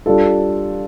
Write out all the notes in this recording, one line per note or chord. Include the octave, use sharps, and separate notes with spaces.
G3 D4 F4 A4